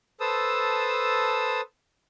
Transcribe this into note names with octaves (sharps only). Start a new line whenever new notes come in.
A4 B4 C5 A5 D#6 E6